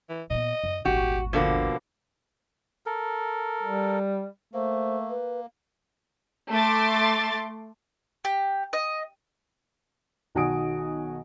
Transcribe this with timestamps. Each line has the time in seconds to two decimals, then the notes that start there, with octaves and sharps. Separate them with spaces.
0.09 E3
0.30 A#2 B3 D#5
0.64 F#2
0.85 D#1 G#1 F#4 G4
1.33 B2 D3 F3 A#3
2.86 A4 A#4
3.63 G3
4.54 A3 A#3 C5
5.10 B4
6.51 A3 C6 D6 A6
8.25 G4
8.73 D#5
10.35 B1 D#3 F#4 G#5 D#6 D7